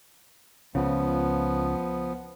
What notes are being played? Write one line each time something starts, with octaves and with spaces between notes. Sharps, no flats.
C#2 C#3 F3 B3